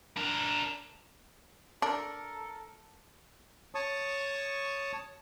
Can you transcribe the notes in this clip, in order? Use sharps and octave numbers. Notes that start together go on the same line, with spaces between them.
D4 A#4
D4 A4 A#4
C#5 A5 C#6 D#6